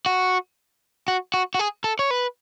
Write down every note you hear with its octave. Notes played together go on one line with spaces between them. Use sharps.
F#4
F#4
F#4
F#4
G#4
A4
C#5
B4